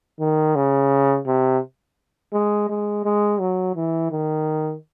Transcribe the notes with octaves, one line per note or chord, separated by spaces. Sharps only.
D#3
C#3
C3
G#3
G#3
G#3
F#3
E3
D#3